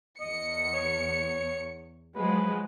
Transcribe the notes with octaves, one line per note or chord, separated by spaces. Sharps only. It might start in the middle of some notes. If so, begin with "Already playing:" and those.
E2 D#5 C#7
C#5
F3 F#3 G#3 B4